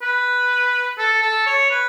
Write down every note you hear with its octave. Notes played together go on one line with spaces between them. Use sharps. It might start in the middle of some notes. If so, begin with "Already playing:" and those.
B4
A4
A4
C#5
B4